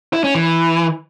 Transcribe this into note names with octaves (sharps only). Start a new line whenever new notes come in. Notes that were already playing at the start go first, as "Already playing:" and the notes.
E4
C#4
E3